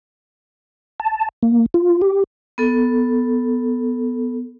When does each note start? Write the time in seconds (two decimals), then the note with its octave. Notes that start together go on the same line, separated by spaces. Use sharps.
1.00 A5
1.43 A#3
1.74 F4
2.01 G4
2.58 B3 A4